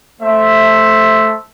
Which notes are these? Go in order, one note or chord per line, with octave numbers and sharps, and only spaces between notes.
A3 C5 E5